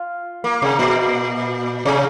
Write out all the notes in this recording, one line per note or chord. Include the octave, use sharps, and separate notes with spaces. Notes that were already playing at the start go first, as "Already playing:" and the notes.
Already playing: F4
A#3
C3
A#2
C3